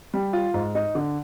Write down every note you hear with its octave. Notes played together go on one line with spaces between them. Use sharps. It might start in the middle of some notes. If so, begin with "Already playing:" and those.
G3
F4
G#2
D#4
D3